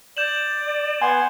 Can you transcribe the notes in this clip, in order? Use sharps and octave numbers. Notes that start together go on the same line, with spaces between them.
D5 G6 E7 F#7
B3 F#5 G#5 C6